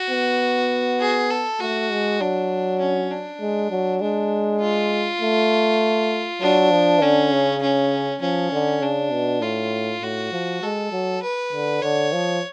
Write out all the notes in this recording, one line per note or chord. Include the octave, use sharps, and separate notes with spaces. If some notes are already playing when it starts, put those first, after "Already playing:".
Already playing: F#4
B3
G#4
A4
A3 F#4
G#3
F#3 D4
C#4
D4
G#3
F#3
G#3 D4
F4
A3
F#3 D4
F3
D3 C#4
C#3
C#4
F3 C#4
D3
C#3 D4
B2
A2 F4
A2 F#4
F3
G#3 A4
F#3
B4
D3
D3 C#5
F3